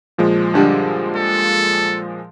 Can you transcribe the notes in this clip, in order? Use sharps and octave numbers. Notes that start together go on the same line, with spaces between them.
A#2 F3 G#3
G2 D3 G3
A4